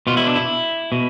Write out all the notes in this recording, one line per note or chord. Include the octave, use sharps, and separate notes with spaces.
B2 F4
E4
D4
E4
B2